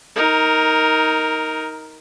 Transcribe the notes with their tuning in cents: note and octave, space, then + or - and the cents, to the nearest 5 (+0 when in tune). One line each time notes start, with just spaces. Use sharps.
D#4 +20 A#4 +0